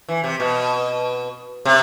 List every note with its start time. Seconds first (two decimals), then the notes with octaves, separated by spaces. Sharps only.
0.09 E3
0.24 C3
0.40 B2
1.65 C3